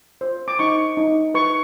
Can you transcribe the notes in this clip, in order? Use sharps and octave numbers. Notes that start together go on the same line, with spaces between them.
C5
D6
D#4 C#6
D#4
B4 C#6